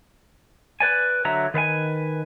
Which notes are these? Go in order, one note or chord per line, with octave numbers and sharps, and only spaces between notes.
B4 D5 G#5
D3 F#3 E5 A#5
D#3 B4 F5 G#5